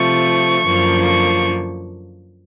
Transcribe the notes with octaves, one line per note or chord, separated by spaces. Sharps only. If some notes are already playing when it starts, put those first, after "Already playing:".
Already playing: C3 F3 A3 C#6
F#2 D3 F3 A#3
C#6